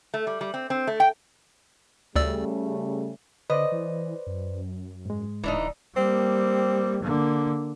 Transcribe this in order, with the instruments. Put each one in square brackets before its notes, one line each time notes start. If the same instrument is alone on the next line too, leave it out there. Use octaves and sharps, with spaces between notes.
[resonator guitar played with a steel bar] A3
G3
G3
C4
C4
A3
G5
[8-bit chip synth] D2 D5 E6 [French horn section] C#3 G3 A3
[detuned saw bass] D3 [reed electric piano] B4 C5 D5 [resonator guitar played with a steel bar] D#5
[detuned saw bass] E3
F#2
[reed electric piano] G#2 G#3
[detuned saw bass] D1 [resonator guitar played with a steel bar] E3 D4 D#4
[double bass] G3 A#3 [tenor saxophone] C4
[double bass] D3 A#3